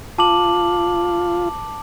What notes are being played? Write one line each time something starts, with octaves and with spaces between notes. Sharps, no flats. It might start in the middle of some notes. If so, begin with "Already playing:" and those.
F4 A5 D6 F#7